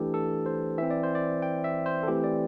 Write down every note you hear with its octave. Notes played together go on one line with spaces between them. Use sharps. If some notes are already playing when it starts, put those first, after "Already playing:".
Already playing: E3 A3 D4 G4 A4
A4
C5
E3 C4 E5
D5
C5
D5
G5
E5
C5
A4
E3 A3 C4 G4
D5